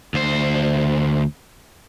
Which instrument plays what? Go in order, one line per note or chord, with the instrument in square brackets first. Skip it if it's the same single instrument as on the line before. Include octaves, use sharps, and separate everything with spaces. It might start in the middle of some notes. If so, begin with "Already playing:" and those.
[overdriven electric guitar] D2 C5